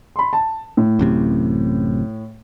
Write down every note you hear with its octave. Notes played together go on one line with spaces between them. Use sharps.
B5 C6
A5
A2
A1 F#2 C3